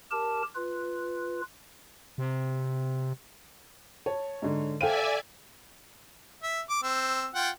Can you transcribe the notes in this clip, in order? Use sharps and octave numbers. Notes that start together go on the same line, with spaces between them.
G4 A#4 A5
F4 B4
C3
C#5 A5
G#2 D3
A4 C5 D5 E5 F5 G5 G#5 D#7
E5
D6
C4 E6
F4 F#5 G5